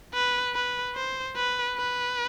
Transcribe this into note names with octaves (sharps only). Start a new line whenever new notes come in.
B4
B4
C5
B4
B4